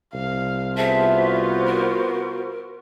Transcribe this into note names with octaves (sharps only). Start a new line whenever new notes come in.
C2 F5
B3 F4 G#4 C5 E5 A5
F#4 C5
A#4